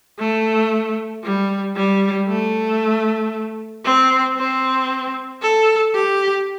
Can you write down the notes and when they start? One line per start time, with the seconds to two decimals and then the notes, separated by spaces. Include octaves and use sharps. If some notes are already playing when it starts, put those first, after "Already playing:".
0.19 A3
1.24 G3
1.76 G3
2.28 A3
3.85 C4
4.37 C4
5.42 A4
5.95 G4